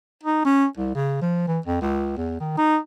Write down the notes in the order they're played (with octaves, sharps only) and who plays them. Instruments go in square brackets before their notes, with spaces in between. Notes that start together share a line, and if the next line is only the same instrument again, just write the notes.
[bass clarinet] D#4
C#4
C2
C#3
F3
E3
F2
C#2
E2
D#3
D#4